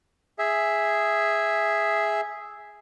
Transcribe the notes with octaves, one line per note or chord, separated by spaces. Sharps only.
G#4 E5